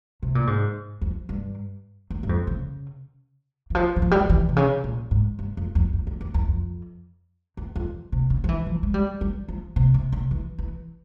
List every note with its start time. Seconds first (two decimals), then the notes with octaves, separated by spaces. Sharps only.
0.22 C3
0.35 A#2
0.47 G#2
1.01 F2
1.29 G2
2.10 E2
2.23 G2
2.29 F2
2.47 C#3
3.70 E3
3.75 F3
3.96 E3
4.02 F3
4.11 G3
4.20 F3
4.30 E3
4.49 C3
4.56 C#3
4.84 A#2
5.11 G#2
5.39 G2
5.57 F2
5.75 F2
5.93 F2
6.07 F2
6.21 E2
6.34 E2
6.48 F2
7.57 E2
7.76 F2
8.12 C3
8.30 C#3
8.44 F3
8.49 E3
8.66 F3
8.83 G#3
8.94 G3
9.21 G3
9.48 F3
9.76 C3
9.94 C3
10.12 C#3
10.31 E3
10.58 E3